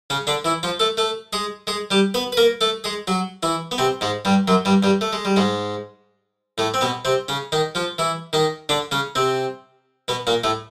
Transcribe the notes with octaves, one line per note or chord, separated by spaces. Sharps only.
C#3 C#4
D3 D4
E3 E4
F3 F4
A3 A4
A3 A4
G#3 G#4
G#3 G#4
G3 G4
B3 B4
B4
A#3 A#4
A3 A4
G#3 G#4
F#3 F#4
E3 E4
B3
C3 C4
G#2 G#3
G2 G3
F#2 F#3
G2 G3
G2 G3
A3
G#3
G3
G#2 G#3
A2 A3
C4
B2 B3
C3 C4
C#3 C#4
D#3 D#4
F3 F4
E3 E4
D#3 D#4
D3 D4
C#3 C#4
C3 C4
B2 B3
A#2 A#3
A2 A3